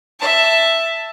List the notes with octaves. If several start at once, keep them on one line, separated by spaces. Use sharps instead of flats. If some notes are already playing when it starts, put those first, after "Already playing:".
E5 A5